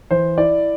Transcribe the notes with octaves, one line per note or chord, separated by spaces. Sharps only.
E3 C5
E4 D5